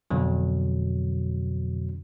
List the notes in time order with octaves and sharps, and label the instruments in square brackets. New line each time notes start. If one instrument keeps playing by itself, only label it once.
[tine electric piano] F2 B2 D3 F#3